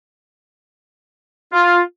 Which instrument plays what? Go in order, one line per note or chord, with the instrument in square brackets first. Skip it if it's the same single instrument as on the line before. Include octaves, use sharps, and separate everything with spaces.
[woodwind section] F4